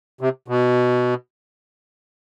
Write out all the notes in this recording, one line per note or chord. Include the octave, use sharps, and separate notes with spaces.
C3
B2